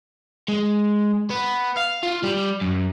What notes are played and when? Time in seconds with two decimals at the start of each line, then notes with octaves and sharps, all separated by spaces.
0.48 G#3
1.30 B3
1.77 F5
2.03 F4
2.23 G3
2.61 F#2